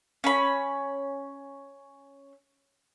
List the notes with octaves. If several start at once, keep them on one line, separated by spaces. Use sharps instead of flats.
C#4 B5